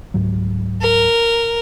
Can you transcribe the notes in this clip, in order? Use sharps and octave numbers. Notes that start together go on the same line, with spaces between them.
C#2 G#2 F#3
A#4